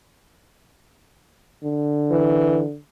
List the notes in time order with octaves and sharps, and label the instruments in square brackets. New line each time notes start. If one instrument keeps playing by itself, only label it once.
[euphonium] D3
[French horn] E3